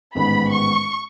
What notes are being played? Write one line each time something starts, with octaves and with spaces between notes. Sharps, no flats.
A1 G#2 D#3 G#3 B3 B5
C#6